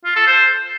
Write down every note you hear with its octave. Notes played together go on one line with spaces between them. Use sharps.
F4
A4
C5